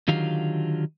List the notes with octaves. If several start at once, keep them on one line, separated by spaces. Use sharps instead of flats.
D3 D#3 F#3 F4 G4 F5